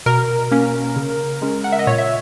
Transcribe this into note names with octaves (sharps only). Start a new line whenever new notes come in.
B2 A#4
A#3 C#4
C#3
G#3 C#4
F#5
E5
D#5
A#2 C#5
E5